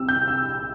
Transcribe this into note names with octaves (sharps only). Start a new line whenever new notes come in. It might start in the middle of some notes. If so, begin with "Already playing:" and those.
Already playing: C2 C3 G3 E6
G6
E6